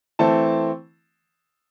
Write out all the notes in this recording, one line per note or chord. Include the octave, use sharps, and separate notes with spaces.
E3 A3 C4 A5